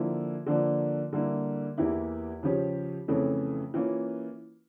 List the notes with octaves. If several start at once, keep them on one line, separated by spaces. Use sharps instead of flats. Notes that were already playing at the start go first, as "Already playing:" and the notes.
Already playing: D3 F3 A#3 E4
D3 F3 A#3 D4
D3 G3 A#3 E4
E2 E3 A#3 E4 G4
C#3 F3 C#4 G4
F2 C#3 E3 A3 C#4
E3 A#3 C#4 F4